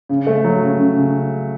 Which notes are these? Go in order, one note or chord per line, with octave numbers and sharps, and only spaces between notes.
C#3
A3
F#3
C#3
C#3
C#3